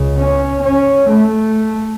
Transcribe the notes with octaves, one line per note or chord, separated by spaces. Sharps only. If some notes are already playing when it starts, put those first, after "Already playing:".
Already playing: C#2 C#3
C#4
C#4
A3